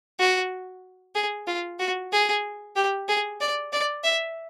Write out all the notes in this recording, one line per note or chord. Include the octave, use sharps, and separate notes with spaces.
F#4
G#4
F4
F#4
G#4
G4
G#4
D5
D5
E5